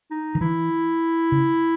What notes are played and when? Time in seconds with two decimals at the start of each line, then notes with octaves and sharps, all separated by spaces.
0.11 D#4
0.35 D#3
0.41 E3 E4
1.32 C#3